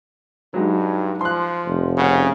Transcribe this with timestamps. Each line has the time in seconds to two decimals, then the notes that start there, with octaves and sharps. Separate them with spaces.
0.54 G2 F#3 G#3 D#4
1.21 F3 C6 F#6
1.67 F1
1.97 C#3 C#4 F#5